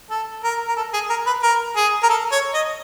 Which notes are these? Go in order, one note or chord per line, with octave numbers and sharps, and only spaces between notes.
A4
A#4
A#4
A4
G#4
A#4
B4
A#4
G#4
A#4
A4
C#5
D#5